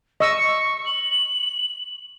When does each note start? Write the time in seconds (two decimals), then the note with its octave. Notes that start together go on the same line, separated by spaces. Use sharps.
0.20 D#5 C#6 E6
0.86 F#7